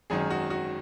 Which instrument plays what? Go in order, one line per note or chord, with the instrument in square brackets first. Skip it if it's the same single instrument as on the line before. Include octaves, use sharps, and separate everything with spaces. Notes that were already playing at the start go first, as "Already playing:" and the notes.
[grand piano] G#1 F#2 D#3 G#4
F#4
F#4